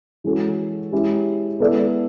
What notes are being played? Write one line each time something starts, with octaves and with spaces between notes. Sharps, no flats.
E3 G#3 C#4 F#4 A4
G#3 C#4 E4 G4
G#3 B3 E4 A4 D5